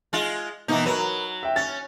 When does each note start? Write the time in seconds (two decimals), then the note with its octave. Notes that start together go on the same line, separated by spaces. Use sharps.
0.13 G#3 F4
0.68 B2 E3 A#3 D#4
0.86 F#3 A#4 B4
1.43 E5 G5
1.56 C#4 A6